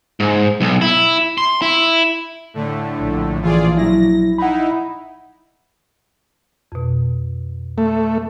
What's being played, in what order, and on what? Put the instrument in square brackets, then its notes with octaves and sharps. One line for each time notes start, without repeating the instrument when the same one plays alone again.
[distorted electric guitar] G#2
B1
E4
C6
E4
[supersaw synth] A2 D3 A3
[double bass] A#1
[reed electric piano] E3 [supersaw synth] F4 G#4 D5
[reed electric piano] F#3 E4 [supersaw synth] A#6
[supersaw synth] D#4 E4 [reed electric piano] F#5 B5
[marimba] F2 B2
[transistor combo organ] A3